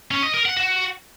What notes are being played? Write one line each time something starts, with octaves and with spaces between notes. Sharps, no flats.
C#4
D#5
A#4
F#5
F#4